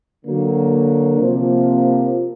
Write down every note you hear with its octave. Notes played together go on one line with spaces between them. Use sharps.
D3 F#3 A#3
C3 F3 A#3